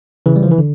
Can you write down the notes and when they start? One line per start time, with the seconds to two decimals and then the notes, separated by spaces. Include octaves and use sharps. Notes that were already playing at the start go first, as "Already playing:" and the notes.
0.26 C#3 E3
0.36 G3
0.43 F3
0.51 E3
0.58 D3